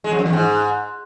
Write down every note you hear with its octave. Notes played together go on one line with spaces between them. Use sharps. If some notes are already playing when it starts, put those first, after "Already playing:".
G#3
F2
F#2
E2
G#2